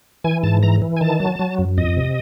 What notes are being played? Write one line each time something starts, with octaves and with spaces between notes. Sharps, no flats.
E3 G#5
G#2 A5
E3 A#5
E3
G#5
D#3 A5
F#3
F#3
F#2
F2 D#5
C3